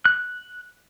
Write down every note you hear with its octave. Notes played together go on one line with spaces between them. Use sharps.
F#6